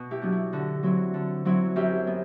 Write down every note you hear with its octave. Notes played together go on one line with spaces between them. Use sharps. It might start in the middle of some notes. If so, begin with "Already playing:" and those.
Already playing: B2
E4 G4
F#3 B3 D4
E4
D3 F#4
F#3 C4 E4
D3
F#3 C4 E4
F#2 E4 G4
B3